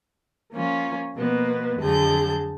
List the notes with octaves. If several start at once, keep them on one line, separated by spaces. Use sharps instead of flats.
F3 A#3 C#4 F4
B2 F3 A#3 B3
F2 D3 F#3 G#4 A5 G6